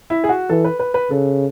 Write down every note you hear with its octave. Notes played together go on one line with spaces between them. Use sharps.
E4
G#4
F#4
E3 A4
B4
B4
B4
C#3 A4